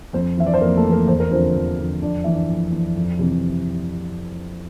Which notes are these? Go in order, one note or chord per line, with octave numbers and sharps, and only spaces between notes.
F2 C4 C5
E3 E5
D5
C5
F2 A#3 A#4
A3 A4
E3
A#3 A#4
E2 C5
A#4
D3 F3 C4 C5
E2
D3 F3
F2 D4 D5
E3 E5
D4 D5
F2
E3
F2
C3 E3